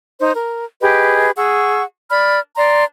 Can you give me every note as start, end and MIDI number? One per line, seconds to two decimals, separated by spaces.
0.20 0.32 63
0.20 0.32 72
0.35 0.64 70
0.81 1.30 67
0.81 1.30 68
0.81 1.30 71
0.81 1.30 75
1.36 1.83 68
1.36 1.83 78
1.36 1.83 85
1.36 1.83 88
2.10 2.39 74
2.10 2.39 83
2.10 2.39 89
2.56 2.84 74
2.56 2.84 82
2.56 2.84 84